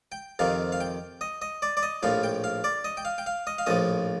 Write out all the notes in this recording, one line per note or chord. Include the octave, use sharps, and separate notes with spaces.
G5
F2 C3 D#3 F5
F5
G5
D#5
D#5
D5
D5
D#5
A#1 A2 F3 F5
G5
F5
D5
D#5
G5
F5
G5
F5
D#5
F5
A#1 A2 F3 D#5